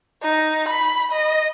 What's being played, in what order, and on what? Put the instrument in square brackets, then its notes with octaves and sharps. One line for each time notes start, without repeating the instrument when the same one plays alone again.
[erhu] D#4
B5
D#5